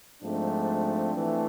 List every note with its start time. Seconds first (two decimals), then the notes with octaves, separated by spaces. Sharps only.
0.22 G#2 F3 A3 C4 D4
1.15 E3 A3